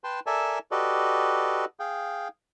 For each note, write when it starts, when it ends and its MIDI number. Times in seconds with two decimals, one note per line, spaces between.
0.04 0.20 71
0.04 0.20 79
0.04 0.20 81
0.04 0.20 84
0.26 0.59 69
0.26 0.59 70
0.26 0.59 74
0.26 0.59 76
0.26 0.59 80
0.26 0.59 81
0.71 1.65 66
0.71 1.65 67
0.71 1.65 69
0.71 1.65 71
0.71 1.65 74
0.71 1.65 75
1.80 2.28 68
1.80 2.28 77
1.80 2.28 79